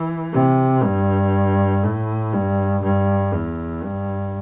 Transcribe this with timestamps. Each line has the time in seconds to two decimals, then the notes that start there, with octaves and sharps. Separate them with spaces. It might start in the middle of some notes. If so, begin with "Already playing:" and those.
Already playing: E3
0.33 C3
0.83 G2
1.84 A2
2.33 G2
2.83 G2
3.33 E2
3.84 G2